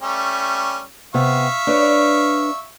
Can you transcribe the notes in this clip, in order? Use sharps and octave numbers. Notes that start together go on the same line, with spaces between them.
G3 A3 C#4
C3 B3 E5 F5 C#6
D4 B4 C#5